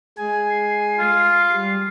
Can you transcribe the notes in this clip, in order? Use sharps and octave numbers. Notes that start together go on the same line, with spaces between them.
G#3 G#4 G#5
C7
F4
G3